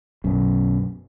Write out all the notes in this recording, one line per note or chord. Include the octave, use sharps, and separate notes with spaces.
B1 F#2